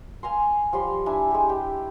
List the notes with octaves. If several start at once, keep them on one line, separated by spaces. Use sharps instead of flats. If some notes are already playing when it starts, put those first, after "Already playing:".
F5 G#5 A#5 C6
F3 G3 C6
D4 E4 E5 G#5
G#3 G4
G4 G5